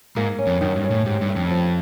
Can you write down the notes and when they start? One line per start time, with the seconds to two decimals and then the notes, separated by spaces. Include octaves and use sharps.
0.16 G#2 A#3
0.39 C#4
0.47 F2
0.61 F#2 D#3
0.76 G2
0.84 C#4
0.91 A2
1.06 G#2 G4
1.21 G2
1.29 A3
1.36 F2
1.51 F3